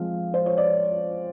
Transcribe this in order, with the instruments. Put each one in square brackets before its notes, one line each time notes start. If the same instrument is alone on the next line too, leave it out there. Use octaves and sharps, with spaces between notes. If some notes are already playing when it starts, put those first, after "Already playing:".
Already playing: [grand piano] F3 G#3 C4 [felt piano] F5
[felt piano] C5
C#5
D5